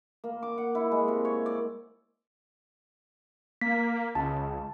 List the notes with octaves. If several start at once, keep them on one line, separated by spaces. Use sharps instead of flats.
A#3
D6
F#5
E4
G#3
C3
C#5
D5
A#3 B6
C#2 A5